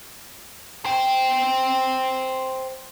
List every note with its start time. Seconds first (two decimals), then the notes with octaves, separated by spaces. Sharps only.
0.85 C5 G5